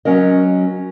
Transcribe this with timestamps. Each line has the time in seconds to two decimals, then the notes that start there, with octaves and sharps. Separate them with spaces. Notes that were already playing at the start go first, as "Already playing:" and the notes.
0.05 F#3 C#4 A#4 D#5